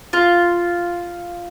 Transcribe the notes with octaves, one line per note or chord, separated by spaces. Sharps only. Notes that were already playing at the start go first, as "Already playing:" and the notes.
F4